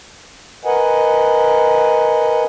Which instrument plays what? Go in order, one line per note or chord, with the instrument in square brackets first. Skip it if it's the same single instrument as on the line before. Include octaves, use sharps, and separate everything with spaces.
[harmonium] A#4 B4 D#5 F#5 G#5